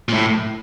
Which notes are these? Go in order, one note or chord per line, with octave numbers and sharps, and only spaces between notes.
A#2
A2